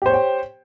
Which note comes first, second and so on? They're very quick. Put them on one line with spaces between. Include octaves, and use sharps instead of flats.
G4 C5 C#5 G5